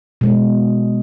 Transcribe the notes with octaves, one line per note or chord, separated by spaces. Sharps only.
B2 G#3